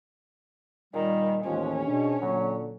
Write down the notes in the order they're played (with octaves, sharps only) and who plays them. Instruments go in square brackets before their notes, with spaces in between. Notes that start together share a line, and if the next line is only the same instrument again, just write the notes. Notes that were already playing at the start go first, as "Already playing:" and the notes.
[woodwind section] A#2 G3 [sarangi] D#3
[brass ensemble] A1 D#2 [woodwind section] F3 G#3 [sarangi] C#4
[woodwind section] G#2 B2 [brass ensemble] D4
[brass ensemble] A#2 D3 [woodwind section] F#3